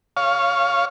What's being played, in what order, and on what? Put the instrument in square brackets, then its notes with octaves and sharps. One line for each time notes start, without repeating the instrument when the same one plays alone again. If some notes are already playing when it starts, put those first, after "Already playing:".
[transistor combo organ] C#5 F5